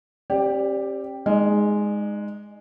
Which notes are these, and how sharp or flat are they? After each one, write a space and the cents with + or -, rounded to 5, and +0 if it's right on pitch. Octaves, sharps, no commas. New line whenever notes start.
C#4 -45 G4 +5 D5 +0
G#3 +0 D#4 +0 D5 +45